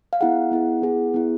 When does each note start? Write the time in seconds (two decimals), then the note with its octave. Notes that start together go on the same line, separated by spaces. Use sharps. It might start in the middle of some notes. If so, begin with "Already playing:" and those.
0.13 F5
0.21 B3 E4 G#4 F#5
0.51 B3 E4 G#4
0.82 B3 E4 G#4
1.14 B3 E4 G#4